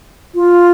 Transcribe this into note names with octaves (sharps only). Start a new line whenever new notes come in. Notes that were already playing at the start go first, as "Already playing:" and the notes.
F4